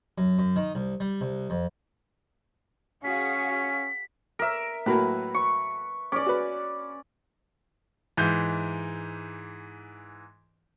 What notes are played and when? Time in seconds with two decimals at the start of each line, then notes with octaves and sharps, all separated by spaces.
0.18 F#2
0.39 F#2
0.56 D#3
0.75 C2
1.00 G3
1.21 C2
1.50 F2
3.04 C#4 F#4 G#4 F5 B6
4.39 A#4 E5
4.86 A2 F#3 A#3 B4
5.34 C#6
6.12 C#4 D5 D6
6.26 F#4 B4
8.17 G#2 E3 G6